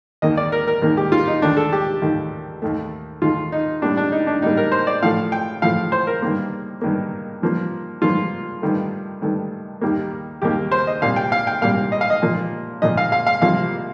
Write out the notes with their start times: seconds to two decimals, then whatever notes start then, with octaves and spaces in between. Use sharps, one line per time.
0.22 D#2 D#3 A#3 D#5
0.37 D5
0.52 A#4
0.67 A#4
0.82 D#2 D#3 A#3
0.97 G4
1.12 F4
1.28 D#4
1.42 D#2 D#3 A3 D4
1.57 A4
1.73 G4
2.02 D#2 D#3 A3
2.62 D#2 D#3 A3
3.22 D#2 D#3 A3 F4
3.52 D#4
3.82 A2 G3 A#3 D4
3.97 D4
4.12 D#4
4.27 D4
4.42 A2 G3 A#3 D#4
4.57 A#4
4.72 C5
4.87 D5
5.02 A2 F3 A3 F5
5.32 G5
5.62 A2 F3 A3 F5
5.92 C5
6.07 A#4
6.22 G2 D#3 A#3
6.82 G2 D#3 A#3
7.42 G2 F3 A#3
8.02 G2 F3 A#3 F4
8.62 G2 D#3 A3
9.22 G2 D#3 A3
9.81 D#2 D#3 G3 A#3
10.42 D#2 D#3 G3 A#3 G4
10.72 C5
10.87 D#5
11.02 C2 A#2 G3 A#3 F5
11.16 G5
11.32 F5
11.47 G5
11.62 C2 A#2 G3 A#3 F5
11.92 D#5
12.01 F5
12.10 D#5
12.22 A#2 F3 A#3
12.82 A#2 F3 A#3 D#5
12.97 F5
13.12 F5
13.27 F5
13.42 C2 C3 F3 A#3 F5